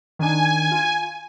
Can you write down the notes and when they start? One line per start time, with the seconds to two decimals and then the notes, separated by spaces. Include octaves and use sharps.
0.19 D#3 D4 G#5
0.72 F4